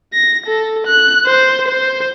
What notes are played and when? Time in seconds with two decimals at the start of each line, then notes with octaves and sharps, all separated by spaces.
0.14 A#6
0.47 A4
0.87 F#6
1.26 C5
1.68 C5